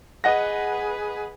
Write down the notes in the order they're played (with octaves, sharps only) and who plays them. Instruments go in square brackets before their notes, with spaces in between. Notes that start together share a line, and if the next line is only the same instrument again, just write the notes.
[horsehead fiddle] G#4 B4 [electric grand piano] D#5 F#5 A#6